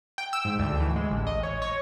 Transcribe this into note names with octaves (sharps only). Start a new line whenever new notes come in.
G5
E6
G#2
D2
E3
G#3
A1
D#5
C#5
C#5